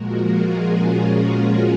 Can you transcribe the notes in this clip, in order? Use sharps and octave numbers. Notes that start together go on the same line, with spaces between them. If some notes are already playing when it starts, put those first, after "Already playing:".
Already playing: A#2 F3 G#3 F#4 A#4
F4 G#4
C#4 F4